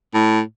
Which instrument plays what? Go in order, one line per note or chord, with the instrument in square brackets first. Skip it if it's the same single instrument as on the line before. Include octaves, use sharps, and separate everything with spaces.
[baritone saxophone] A2